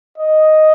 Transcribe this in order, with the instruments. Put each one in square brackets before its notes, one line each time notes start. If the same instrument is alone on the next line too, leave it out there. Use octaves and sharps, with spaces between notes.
[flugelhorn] D#5